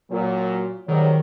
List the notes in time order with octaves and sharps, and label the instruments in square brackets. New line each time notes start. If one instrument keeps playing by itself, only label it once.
[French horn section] A#2 F#3
[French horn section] G#2 F#3 G3 [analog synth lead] D#3